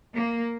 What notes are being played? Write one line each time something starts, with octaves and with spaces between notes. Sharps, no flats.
A#3